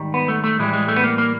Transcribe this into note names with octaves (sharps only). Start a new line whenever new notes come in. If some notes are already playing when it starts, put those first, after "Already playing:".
Already playing: G#2 D#3 G3
B3
A3
A3
A2 E3 G3 G#3
G#3
A3
B3
A#3
A#3